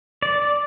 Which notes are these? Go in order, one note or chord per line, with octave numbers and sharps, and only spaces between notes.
D5